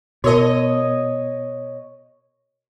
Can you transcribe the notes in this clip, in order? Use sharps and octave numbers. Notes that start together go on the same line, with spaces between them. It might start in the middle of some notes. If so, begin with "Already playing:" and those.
B2 F#4 A#4 C#5 D#5 A5